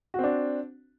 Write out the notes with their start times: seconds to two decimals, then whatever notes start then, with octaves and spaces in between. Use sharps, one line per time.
0.14 F#4
0.19 C4
0.24 D4